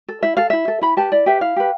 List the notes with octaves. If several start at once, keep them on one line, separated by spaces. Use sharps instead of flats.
A4
E4 E5
A4 F5
E4 E5
A4
E4 B5
G4 B4 A5
E4 D5
G4 B4 E5
E4 F5
G4 B4